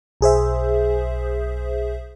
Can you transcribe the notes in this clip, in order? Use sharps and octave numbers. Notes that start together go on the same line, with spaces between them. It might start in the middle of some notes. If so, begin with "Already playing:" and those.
B1 G#4 C5 E5